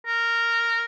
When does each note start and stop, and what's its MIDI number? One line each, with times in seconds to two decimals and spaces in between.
0.06 0.85 70